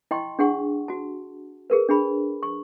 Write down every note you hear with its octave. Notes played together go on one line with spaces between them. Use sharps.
E4 D#5 G5 C6 C#6
D4 G#4 F#5 C#6
F#4 A5
G#4 A#4 B4
D4 G#4 B5
C#6